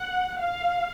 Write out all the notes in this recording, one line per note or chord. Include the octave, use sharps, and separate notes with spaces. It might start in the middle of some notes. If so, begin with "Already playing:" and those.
Already playing: F#5
F5